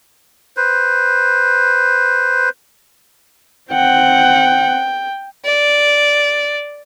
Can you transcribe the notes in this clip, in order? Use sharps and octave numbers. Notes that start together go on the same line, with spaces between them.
B4 C5
C4 F#5 G5
D5